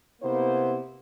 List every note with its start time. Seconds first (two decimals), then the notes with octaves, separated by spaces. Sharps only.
0.22 C3 A#3 B3 E4 C5